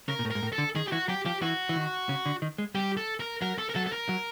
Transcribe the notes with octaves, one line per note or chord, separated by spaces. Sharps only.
C#3 A#4
A#2
A2
G#2 A#4
A2
A4
D3
D#3 G#4
G4
E3 F#4
F#3 G4
F3 G4
E3 F#4
E3
D#3
C#3
D3
D#3
G#3
G3 G4
A4
A#4
F#3 A#4
A4
A#4
F#3 A4
A4
A#4
F#3